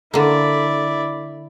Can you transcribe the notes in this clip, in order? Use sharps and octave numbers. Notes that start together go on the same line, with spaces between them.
D3 A#3 E4 D5